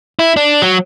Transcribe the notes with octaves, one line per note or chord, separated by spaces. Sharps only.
E4
D4
F#3